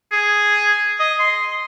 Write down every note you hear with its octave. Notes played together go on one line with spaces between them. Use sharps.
G#4
D#5
C6